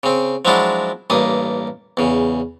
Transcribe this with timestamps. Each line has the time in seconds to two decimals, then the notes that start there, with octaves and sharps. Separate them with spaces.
0.03 C#3 C4
0.45 F3 F#3 G#3 D4 E4 F#4
1.10 A1 G2 A#3 D#6
1.97 E2 C#3